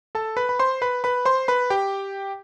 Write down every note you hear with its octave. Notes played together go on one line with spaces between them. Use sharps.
A4 A5
B4 B5
B5
C5 C6
B4 B5
B4 B5
C5 C6
B4 B5
G4 G5